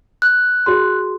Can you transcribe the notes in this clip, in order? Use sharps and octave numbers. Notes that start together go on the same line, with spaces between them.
F#6
F#4 G#4 C6